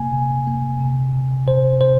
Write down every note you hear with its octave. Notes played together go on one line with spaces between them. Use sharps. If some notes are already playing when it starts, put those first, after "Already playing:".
Already playing: C3 A#3 G#5
C3
A#3
C3
C3
C3 C5
C3 C5